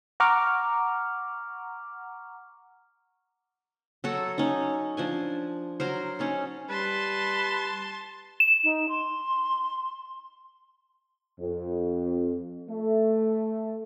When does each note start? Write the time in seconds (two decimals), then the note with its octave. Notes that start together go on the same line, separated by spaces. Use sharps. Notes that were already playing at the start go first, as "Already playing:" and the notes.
0.20 F#5 A#5 C#6 D6 F6
4.04 F#3 F#4 A4
4.38 C#4 D#4
4.97 F3 D4 G#5
5.80 F#3 A#4 C5
6.19 C#4 D#4 A4
6.69 G3 B4 A5 C6
8.40 E7
8.64 D#4
8.89 C6
11.39 F2
12.69 A3